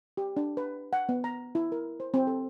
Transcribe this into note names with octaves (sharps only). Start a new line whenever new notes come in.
G4
D4
B4
F#5
B3
A#5
E4
A#4
C5
C4
A4